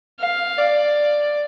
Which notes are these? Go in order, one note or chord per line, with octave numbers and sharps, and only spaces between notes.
F5
D5